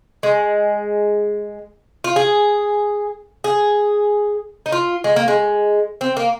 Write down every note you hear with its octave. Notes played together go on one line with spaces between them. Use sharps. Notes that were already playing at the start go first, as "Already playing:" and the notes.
G#3
F4
G#4
G#4
D#4
F4
G#3
A#3
G#3
C4
A#3